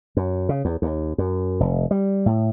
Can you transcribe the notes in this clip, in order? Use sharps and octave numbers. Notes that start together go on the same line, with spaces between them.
F#2
C#3
E2
D#2
F#2
F1
G3
A2